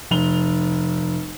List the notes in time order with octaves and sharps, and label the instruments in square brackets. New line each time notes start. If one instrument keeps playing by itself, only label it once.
[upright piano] F1 F7 G7